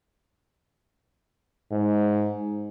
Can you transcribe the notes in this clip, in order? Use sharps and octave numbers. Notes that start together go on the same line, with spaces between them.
G#2